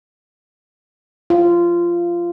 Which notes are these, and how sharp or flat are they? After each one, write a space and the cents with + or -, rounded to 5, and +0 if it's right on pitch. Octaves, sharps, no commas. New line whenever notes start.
F4 -15